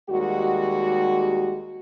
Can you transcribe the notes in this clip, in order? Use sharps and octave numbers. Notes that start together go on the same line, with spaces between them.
D#2 G3 G#3 F#4